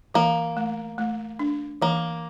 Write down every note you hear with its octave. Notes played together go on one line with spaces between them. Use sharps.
E3 A#3
A3
A3
D4
E3 A#3